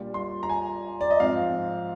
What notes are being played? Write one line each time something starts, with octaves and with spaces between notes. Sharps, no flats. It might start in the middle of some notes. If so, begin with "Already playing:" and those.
Already playing: A#2 G3 D4 F4
C6
A#5
G#5
D5
D#5
G#2 F3 C4 F5